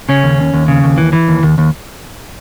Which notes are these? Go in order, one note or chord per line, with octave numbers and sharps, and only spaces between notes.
C#3 C#4
D#2
D#2
D#2
C#3
D#2
E3
E3
D#2
D#2
D#2